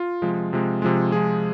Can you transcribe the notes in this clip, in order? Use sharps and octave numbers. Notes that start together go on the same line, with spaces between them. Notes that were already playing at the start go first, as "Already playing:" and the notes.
Already playing: F4
C3 F3 G#3
C3 F3 G#3
C3 F3 G#3
C3 F3 G#3 G#4